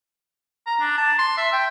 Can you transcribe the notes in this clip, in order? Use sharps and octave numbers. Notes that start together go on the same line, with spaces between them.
A#5
D4
A5
C6
E5
G5